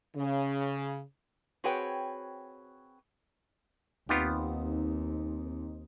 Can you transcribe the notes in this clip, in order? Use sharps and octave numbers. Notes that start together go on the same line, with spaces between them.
C#3
C4 F#4 G#4 B4 C#5 G5
D#2 B3 C4 D#4 F4 G4